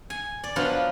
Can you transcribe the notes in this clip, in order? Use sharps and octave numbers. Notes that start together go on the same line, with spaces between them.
G#5
D5
F3 F#3 B3 D4 F4